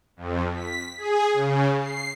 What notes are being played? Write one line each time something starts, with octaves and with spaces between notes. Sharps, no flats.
F2
B6
G#4
C#3
C7